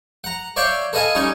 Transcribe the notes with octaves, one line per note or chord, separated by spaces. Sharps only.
F#5 A#5
C#5 D5 E5 F5 G5 C#6
A4 B4 D#5 F5 G#5 A5
G3 C#4 D#4 C#5